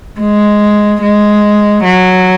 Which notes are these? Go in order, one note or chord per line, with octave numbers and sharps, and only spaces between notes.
G#3
G#3
F#3